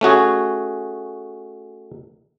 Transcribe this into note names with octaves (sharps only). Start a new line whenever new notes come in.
A3 C#4 F#4 G#4